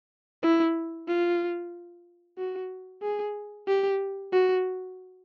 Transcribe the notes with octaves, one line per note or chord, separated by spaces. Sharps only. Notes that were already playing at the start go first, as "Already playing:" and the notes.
E4
F4
F#4
G#4
G4
F#4